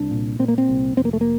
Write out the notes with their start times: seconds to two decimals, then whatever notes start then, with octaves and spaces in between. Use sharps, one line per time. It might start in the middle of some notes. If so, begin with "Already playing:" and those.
Already playing: C2 D4
0.11 A#2
0.39 A#2 C4
0.48 A#3
0.58 C4
0.68 C2
0.97 F1 C4
1.05 A#3
1.13 A3
1.21 A#3